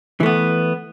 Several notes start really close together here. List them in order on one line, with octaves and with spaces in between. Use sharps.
E3 A3 B3